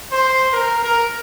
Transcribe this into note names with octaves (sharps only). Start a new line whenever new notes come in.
C5
A#4
A#4